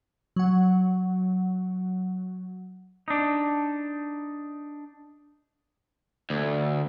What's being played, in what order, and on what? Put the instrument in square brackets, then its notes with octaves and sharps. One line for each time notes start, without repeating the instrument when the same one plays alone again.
[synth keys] F#3 F#5
[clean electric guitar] D4 D#4
[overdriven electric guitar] D2